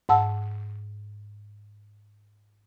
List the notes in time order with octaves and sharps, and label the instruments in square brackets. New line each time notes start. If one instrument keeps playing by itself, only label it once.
[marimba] G#2 F#5 A5 E6